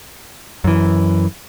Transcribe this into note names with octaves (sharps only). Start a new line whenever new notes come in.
F#2 E3